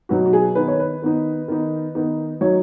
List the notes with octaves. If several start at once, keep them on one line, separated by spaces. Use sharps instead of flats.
B2 F#3 B3 D#4 F#4
F#4
G#4
D#3 B3 D#4 B4
C#5
B4
D#3 B3 D#4
D#3 B3 D#4
D#3 B3 D#4
F#3 D#4 C#5